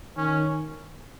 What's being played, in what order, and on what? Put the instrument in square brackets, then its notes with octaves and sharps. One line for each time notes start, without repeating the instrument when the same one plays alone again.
[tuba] D#3 [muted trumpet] C#4